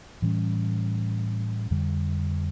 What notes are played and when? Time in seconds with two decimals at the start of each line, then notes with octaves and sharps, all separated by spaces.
0.22 A2 E3 G3 C#4
1.71 F2 D3 G3